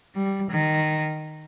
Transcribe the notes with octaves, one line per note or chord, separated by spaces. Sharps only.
G3
D#3